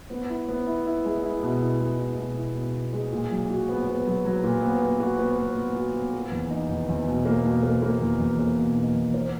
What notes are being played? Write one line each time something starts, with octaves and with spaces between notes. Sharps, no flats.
B3
E4
B3
E4
E4
G#3
E4
B2
E4
G#3
E4
B2
E4
B2
E4
G#3
A#2
F#3
F#4
B3
B3
F#3
F#3
A#2
B3
B3
F#4
B3
B3
B3
F#4
B3
A#3
E2
D#4
E2
E2
B2
A#3
B2
A#3
A#3
E2
E2
A#3
B2
D#4
E2
A#4